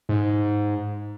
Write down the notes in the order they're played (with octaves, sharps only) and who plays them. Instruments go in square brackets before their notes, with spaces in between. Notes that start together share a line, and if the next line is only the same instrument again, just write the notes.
[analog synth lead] G#2